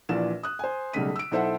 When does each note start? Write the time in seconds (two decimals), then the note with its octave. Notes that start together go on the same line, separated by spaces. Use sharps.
0.09 A#1 A#2 E3 D5 E7
0.43 D#6 F#6
0.59 C5 G#5
0.93 B1 C#3 G3 A3 B6 D#7
1.16 E6 D7
1.31 B1 E4 A4 C5 E5 F#5